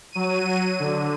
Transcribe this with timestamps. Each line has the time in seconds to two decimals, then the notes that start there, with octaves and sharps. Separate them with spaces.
0.12 F#3 D#7
0.80 D3